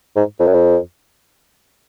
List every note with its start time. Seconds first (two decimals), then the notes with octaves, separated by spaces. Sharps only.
0.16 G#2
0.40 F2
0.47 F#2
0.54 F2